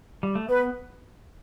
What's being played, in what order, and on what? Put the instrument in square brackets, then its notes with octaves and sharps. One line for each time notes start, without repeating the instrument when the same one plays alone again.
[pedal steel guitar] G3
A3
[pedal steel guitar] B3 [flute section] B4